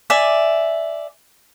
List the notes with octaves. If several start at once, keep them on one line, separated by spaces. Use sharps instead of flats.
D5 E5 G#5